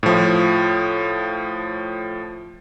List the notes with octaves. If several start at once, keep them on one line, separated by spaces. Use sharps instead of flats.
A2 F3